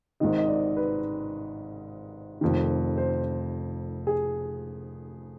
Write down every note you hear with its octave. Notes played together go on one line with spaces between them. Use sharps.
G#1 G#2 D#3 D#5
D#5
D5
B4
F1 F2 D#3
C5
G#4